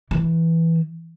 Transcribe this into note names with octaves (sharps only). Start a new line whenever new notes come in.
E3